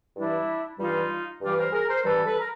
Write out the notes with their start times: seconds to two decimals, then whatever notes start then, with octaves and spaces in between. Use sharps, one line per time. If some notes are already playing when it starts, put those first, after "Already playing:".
0.16 G2 E3 G3 D4 E4
0.79 G2 E3 G3 D#4 F4
1.41 G2 E3 G3 F4 G4
1.57 A#4 C5
1.73 G#4 A#4
1.88 A#4 C5
2.04 G2 E3 G3 A4 B4
2.25 A4 B4
2.39 A#4